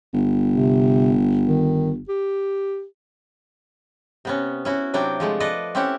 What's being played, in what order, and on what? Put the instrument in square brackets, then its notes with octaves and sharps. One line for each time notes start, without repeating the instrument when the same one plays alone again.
[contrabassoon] G1
[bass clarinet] C3
D#3
G4
[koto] C3 B3 C#4
C#4 E4 F#4
C3 F#3 D4 E4 G5
F3 G#3 A3
A4 B4 D5 D#5
C4 C#4 E4 G4 E5 F#5